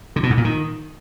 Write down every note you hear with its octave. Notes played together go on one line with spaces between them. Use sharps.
D3
B2
G#2
A#2
D#3